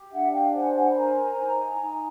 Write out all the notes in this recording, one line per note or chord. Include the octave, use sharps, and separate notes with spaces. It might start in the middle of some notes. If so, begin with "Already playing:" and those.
Already playing: G4
D4 E5 F#5
F5 G5
C5 F#5 G#5
F#5 G#5
B5
A#4 G#5 A#5
D#4
D#4